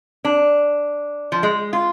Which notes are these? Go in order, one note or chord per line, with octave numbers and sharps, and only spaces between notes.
D4
F3
G#3
F4